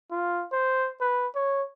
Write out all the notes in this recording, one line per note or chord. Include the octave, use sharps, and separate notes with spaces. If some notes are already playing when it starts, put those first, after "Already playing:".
F4
C5
B4
C#5